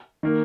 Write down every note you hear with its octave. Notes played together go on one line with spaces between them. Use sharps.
D#3 A#3